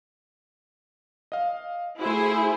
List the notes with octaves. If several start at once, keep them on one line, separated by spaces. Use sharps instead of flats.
D#5 F5
A3 E4 F#4 G#4 C5